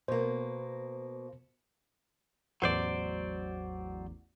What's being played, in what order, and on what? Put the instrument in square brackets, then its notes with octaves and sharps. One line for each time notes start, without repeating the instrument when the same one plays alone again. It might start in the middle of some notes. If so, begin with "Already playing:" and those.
[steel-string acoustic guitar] B2 A#3 [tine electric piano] C5
[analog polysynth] A1 E2 [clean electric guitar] F#3 C5 D5